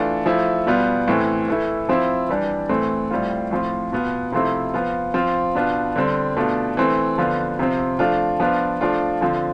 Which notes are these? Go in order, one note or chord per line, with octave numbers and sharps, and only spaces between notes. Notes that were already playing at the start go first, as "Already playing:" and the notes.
Already playing: E3 A3 D4 F4
F3 A3 E4
B2 G3 B3 F4
A2 E3 A3 C4
E3 A3 E4
F3 C4 E4
E3 G3 D4
A2 E3 A3 C4
A2 G3 C4 F4
A2 F3 C4 F4
B2 B3 F4
C3 F3 A3 C4 E4
F3 B3 F4
F3 C4 F4
B2 B3 D4 F4
D3 G3 C4
B2 A3 D4 F4
E3 A3 C4
D3 F3 B3 F4
C3 F3 C4
F3 A3 D4 F4
F3 B3 D4 F4
F3 A3 D4 F4
D3 F3 C4